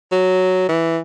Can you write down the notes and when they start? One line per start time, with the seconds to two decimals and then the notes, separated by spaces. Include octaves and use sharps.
0.12 F#3
0.69 E3